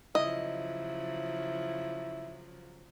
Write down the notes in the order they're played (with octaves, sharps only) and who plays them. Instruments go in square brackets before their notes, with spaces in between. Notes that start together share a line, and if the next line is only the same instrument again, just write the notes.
[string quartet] C#3 F3 F#3 [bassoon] E4 [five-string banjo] D#5